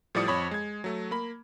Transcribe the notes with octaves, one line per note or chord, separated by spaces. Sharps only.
A2 F3 G3 D5 D#6 C#7
F2 C#5 B5 D#6 G#6
G#3 G#6
F#3 A3
A#3 B5